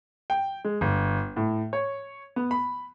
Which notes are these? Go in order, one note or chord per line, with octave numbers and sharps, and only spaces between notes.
G5
G#3
G1
A2
C#5
B3
B5